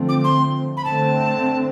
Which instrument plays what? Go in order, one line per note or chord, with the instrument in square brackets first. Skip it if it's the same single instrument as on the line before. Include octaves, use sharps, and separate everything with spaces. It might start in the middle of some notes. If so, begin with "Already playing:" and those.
Already playing: [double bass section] D3 F3 A3 C4
[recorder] D6
C6
B5
[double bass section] D3 A3 C4 [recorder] A5